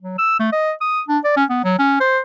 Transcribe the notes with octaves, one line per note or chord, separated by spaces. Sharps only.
F#3
E6
A3
D#5
D#6
D4
D5
C#4
B3
F#3
C#4
C5